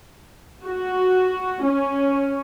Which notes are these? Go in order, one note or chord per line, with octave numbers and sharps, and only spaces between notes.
F#4
C#4